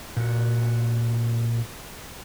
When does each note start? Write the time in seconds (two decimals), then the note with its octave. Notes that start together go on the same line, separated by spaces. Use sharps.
0.17 A#2 F#4